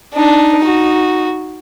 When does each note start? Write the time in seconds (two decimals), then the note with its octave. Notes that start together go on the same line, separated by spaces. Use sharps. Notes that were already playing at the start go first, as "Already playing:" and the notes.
0.15 D4 D#4
0.64 F#4